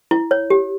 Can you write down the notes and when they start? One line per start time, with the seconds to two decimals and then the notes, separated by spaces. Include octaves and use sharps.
0.11 E4
0.31 C#5
0.50 G4